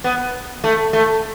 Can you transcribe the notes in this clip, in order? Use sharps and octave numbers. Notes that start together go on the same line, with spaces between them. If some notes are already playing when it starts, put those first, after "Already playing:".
B3
A3
A3